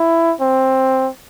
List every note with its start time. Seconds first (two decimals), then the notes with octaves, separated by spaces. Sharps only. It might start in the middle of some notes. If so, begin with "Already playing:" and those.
Already playing: E4
0.41 C4